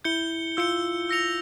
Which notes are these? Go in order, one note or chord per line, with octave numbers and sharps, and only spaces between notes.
E4 G6 C#7 G7
F4 E6 G6 C#7 G7
E6 A#6 C#7 F7